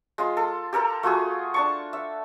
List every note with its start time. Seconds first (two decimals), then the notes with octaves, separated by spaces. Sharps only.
0.18 G#3 F4 C6
0.37 A4
0.73 G4 A4 A#4 A#5
1.03 A3 F4 F#4 G#4
1.54 D4 A5 C#6
1.93 E5